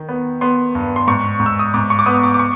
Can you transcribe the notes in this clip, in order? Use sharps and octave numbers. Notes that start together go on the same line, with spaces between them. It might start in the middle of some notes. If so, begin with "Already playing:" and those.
Already playing: D#3
B3
B3 C6
G2
C6
G#2 C#6
G#2
E6
D#6
G#2 D6
C#6
D6
B3 D#6
D6
D6
C#6